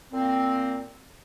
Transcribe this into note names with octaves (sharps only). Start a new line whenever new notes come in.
A#2 A#3 C4